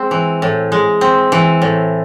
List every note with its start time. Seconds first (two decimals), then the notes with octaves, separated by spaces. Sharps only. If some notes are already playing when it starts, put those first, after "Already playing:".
Already playing: G#3 C4
0.11 E3
0.42 A2
0.72 G#3
1.01 C4
1.32 E3
1.62 A2